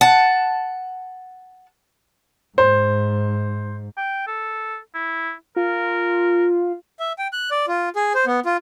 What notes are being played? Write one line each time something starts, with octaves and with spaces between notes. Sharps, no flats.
F#5 A5
G#2 C5
G5
A4
E4
F4 A#4
E5
G5
F#6
D5
F4
G#4
C5
B3
F4